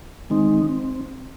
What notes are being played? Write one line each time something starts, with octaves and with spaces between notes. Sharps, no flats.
D#3 G#3 C4 D#4
C4